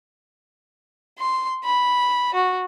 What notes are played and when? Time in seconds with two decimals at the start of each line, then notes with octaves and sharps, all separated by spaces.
1.18 C6
1.64 B5
2.34 F#4